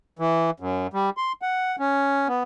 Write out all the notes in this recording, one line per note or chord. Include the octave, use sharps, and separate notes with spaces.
E3
F#2
G3
C6
F#5
C#4
B3